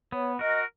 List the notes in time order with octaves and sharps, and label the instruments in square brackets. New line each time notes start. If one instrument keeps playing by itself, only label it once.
[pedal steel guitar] B3 [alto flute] C#5
[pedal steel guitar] F#4 A#4 [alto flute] D#5